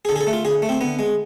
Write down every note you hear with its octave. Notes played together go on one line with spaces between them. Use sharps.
G#4
D3 A4
G#4
A4
A3
F4
D3 G#4
A3
C4
D3 B3
G#3